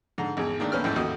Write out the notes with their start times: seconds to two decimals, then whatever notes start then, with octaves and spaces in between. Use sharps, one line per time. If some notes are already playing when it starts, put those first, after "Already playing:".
0.18 G#2 D3 A#5
0.37 G#1 E2 G#4
0.60 D#3 A3 A#3 D4
0.72 D2 A#3 C#4 B4 G5 F6
0.84 G#1 F#2 A2 A3 G5
0.96 A1 D#2 F#4 D#5